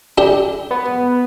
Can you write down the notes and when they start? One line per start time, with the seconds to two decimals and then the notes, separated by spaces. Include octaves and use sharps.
0.18 D4 G4
0.71 B3